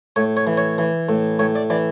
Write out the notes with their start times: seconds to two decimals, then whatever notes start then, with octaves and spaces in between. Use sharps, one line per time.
0.16 A2 C#5
0.37 C#5
0.47 E3
0.57 C#5
0.78 E3
1.09 A2
1.39 A2 C#5
1.55 D5
1.70 E3 D5